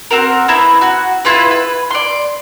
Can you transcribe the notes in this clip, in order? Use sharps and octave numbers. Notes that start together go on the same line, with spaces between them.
C4 F#4 A#4
B3 C4 E4 A#5
F#4
E4 F4 G#4 B4
B4
D5 C6